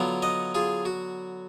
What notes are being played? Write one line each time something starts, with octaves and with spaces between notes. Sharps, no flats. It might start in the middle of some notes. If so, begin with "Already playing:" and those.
Already playing: D3 F#3 B3 F4
D#5 F#5
F4 G#4
F#4